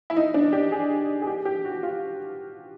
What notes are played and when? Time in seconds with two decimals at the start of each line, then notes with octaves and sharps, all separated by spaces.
0.10 E4
0.16 D#4
0.34 D4
0.53 G4
0.72 G#4
1.22 G#4
1.27 G4
1.45 G4
1.65 F#4
1.83 F4